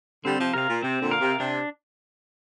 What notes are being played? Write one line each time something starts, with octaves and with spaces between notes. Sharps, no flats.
D3 G3 C4
C3 F3
C3 A#4 F5
A#2
C3 C4
A#2 D3
A#4 F5
C3
C3 D4